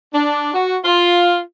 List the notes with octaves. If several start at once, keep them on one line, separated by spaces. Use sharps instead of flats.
D4
F#4
F4